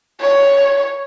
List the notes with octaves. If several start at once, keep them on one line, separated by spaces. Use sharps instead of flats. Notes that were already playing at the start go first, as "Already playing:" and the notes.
C#5